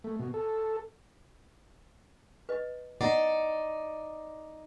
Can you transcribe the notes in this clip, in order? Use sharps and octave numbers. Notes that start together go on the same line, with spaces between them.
A3
B2
A4
B4 D#5
D#4 D5 F#5 A#5